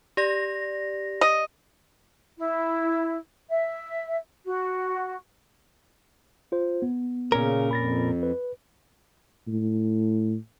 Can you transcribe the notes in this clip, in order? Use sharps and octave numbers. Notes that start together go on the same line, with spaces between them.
G4 D5 A#6
D#5
E4
E5
F#4
F4 C5
B3
A#2 C#3 C#4 A#4
F2 B5 A6 A#6
B4
A2